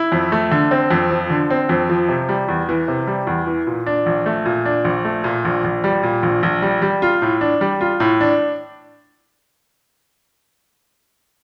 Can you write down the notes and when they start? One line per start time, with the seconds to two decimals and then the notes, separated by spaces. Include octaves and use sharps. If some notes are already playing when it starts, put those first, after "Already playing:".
Already playing: E4
0.12 F2
0.32 A3
0.51 D3
0.71 C4
0.91 F2
1.11 F3
1.30 D3
1.50 C4
1.69 F2
1.89 F3
2.09 C3
2.29 G3
2.49 E2
2.69 E3
2.88 C3
3.07 G3
3.27 E2
3.47 E3
3.67 A#2
3.86 D4
4.06 A#1
4.26 A3
4.46 A#2
4.66 D4
4.85 A#1
5.05 A3
5.24 A#2
5.45 A#1
5.64 A#1
5.84 G3
6.03 A#2
6.23 A#1
6.43 A#1
6.62 G3
6.82 G3
7.02 F4
7.22 A2
7.41 D4
7.61 G3
7.81 F4
8.00 A2
8.21 D4